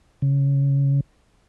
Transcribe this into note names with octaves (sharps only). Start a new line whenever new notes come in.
C#3